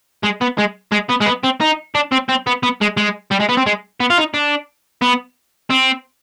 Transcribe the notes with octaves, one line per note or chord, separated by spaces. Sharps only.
G#3
B3
G#3
G#3
B3
G#3
B3
C4
D#4
D4
C4
C4
B3
B3
G#3
G#3
G3
G#3
B3
C4
G#3
B3
F4
D#4
D4
B3
C4